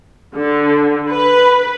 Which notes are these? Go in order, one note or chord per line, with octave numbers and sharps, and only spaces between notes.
D3
B4